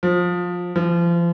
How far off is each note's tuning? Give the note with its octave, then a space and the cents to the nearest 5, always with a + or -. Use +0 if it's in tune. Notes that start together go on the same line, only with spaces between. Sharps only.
F3 +20
F3 -35